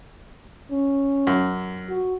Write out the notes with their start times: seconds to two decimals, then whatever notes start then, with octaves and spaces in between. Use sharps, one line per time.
0.71 C#4
1.27 F#2
1.89 F#4